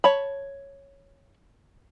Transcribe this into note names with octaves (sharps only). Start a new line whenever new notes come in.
C#5 A5 B5